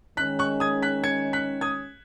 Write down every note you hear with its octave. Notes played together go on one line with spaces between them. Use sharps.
D#3 G#3 C#4 F#6 B6
C#6 F#6
D#6 G#6
F#6 B6
G#6 C#7
F#6 B6
D#6 G#6